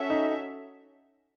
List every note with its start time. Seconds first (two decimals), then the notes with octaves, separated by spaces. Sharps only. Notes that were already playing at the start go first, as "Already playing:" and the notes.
Already playing: C#4 F#4 A4 E5
0.10 D#4